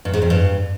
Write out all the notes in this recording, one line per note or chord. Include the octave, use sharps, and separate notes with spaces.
G2
G#2
F2
G2